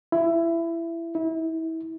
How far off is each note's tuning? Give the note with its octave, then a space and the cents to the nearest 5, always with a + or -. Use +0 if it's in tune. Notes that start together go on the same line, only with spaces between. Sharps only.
E4 +20
E4 -30